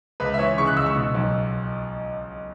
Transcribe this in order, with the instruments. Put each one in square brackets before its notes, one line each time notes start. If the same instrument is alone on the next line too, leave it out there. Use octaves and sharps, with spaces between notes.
[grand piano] C#2 B4
E5
E3 C#5
C#3 C#6
F#6
C#2 E6
C#6
B2
B1